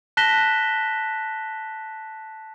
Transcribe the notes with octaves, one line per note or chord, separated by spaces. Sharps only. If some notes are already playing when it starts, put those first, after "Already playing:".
A5 F#6 A#6 B6 E7 G7